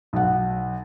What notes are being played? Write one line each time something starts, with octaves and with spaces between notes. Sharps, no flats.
B1 F#5